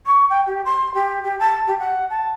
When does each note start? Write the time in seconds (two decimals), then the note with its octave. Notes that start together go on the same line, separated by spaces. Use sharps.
0.06 C#6
0.29 G5
0.46 G4
0.65 C6
0.94 G4
1.23 G4
1.39 A5
1.67 G4
1.79 F#5
2.10 A5